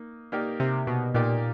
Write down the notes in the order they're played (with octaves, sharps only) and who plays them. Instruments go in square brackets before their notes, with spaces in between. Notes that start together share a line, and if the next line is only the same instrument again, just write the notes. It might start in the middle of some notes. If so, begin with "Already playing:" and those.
Already playing: [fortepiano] A#3 D#4
A#3 D#4 G4 A#4 D5
[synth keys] C3
B2
[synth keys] A#2 [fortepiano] A#3 D#4 G4 A#4 D5